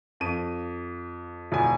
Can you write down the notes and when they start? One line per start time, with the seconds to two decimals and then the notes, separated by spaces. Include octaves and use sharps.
0.20 F2 D#7
1.52 E1 G#5